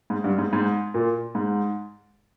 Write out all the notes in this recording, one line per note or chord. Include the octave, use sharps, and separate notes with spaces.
G#2
G2
G#2
G#2
A#2
G#2